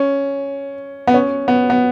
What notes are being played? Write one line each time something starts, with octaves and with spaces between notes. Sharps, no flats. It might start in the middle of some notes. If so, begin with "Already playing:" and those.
Already playing: C#4
B3
C#4
B3
B3